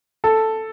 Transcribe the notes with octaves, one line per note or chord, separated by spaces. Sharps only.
A4